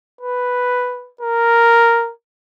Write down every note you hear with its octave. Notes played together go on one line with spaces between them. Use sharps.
B4
A#4